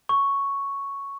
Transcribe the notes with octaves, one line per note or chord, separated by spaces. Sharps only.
C#6